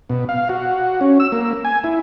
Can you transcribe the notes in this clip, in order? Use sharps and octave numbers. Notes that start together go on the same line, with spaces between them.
B2
F5
F#4
C#4
E6
A#3
G#5
E4